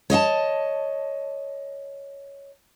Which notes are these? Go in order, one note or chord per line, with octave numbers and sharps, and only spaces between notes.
C#5 D#5 F5 A5